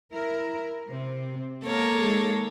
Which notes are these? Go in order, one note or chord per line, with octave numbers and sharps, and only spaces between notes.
E4 A#4
C3 C4
G#3 A#3 B3 A4 A#4 C#5
D#3 G#3 G#4